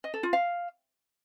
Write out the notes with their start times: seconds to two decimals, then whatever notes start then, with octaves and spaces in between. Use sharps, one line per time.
0.04 D#5
0.14 A4
0.23 F4
0.33 F5